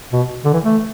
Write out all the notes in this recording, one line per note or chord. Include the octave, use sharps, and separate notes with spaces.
B2
D3
E3
A3